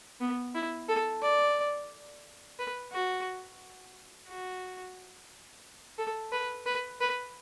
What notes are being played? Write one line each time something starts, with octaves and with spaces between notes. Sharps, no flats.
B3
E4
A4
D5
B4
F#4
F#4
A4
B4
B4
B4